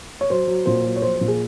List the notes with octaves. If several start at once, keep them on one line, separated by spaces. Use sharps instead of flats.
C#5
F#3 C5
F#3
A#2 C5
F#3
C#5
F3 C5
C5
A#2
G#4